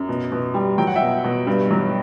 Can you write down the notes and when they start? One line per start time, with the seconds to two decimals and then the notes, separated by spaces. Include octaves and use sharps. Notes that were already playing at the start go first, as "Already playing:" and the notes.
Already playing: F#2
0.09 B2
0.32 B2
0.54 G3
0.78 F#3 G5
0.87 F#5
0.96 E5 G5
1.02 B2
1.24 B2
1.47 G2
1.71 F#3